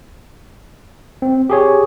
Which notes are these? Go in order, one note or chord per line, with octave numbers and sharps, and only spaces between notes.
C4
G4 G#4 C#5